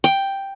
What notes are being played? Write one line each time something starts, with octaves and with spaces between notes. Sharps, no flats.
G5